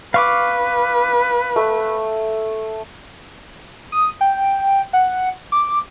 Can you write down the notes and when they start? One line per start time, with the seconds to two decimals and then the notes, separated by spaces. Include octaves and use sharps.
0.14 B4 F5 C#6 D6
1.56 A3
3.92 D#6
4.21 G5
4.93 F#5
5.52 D6